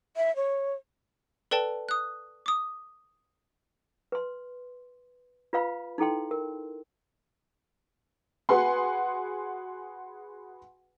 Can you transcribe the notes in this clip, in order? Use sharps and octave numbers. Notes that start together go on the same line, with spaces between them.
E5
C#5
A4 B4 D5 G5 A5
D#6 F#6
D6 D#6
B4 C6
F4 B4 F5 B5
D#4 E4 A4 G5 C6
A#4
F#4 G#4 B4 F#5 G#5 C6